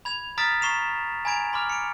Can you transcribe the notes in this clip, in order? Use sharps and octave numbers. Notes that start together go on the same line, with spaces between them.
B5 G#6 F7
A#5 D#6 F6 A6 B6 D7
A#5 C#6 C7 E7 F7
G#5 A#5 B5 G#6 D7 F7
B5 C6 D6 F6
C#7 D7